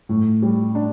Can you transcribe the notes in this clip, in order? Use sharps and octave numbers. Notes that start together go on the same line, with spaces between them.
A2
G3
D4